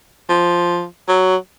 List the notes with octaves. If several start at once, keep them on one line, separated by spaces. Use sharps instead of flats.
F3
F#3